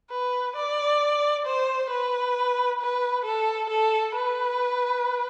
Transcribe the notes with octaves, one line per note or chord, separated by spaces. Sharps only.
B4
D5
C5
B4
B4
A4
A4
B4